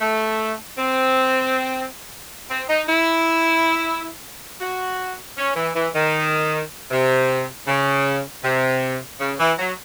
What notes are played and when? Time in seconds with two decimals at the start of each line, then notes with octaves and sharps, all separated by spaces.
0.01 A3
0.78 C4
2.50 C4
2.68 D#4
2.88 E4
4.61 F#4
5.38 C#4
5.56 E3
5.75 E3
5.94 D#3
6.91 C3
7.67 C#3
8.43 C3
9.20 C#3
9.39 E3
9.59 F#3